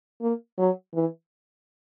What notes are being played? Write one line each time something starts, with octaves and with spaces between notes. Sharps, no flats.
A#3
F#3
E3